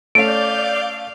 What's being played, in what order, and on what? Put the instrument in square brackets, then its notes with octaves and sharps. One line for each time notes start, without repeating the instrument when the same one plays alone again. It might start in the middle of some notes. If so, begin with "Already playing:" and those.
[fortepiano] A3 C#4 [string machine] D5 D6 G6 [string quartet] F5 [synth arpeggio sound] D7